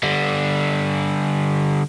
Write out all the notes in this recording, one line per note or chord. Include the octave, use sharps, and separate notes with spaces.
D3 G3